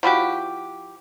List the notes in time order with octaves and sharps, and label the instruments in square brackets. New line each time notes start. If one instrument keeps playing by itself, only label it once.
[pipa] F3 E4 F#4 G4